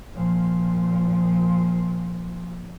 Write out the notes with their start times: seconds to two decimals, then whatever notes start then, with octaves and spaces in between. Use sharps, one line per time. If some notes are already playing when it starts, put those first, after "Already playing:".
0.14 A#2 F3